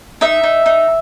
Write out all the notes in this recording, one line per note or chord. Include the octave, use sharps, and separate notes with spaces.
D#4 E5
D#4
D#4